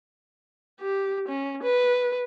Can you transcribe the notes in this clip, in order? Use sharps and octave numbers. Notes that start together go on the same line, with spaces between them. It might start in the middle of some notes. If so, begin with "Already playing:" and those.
G4
C#4
B4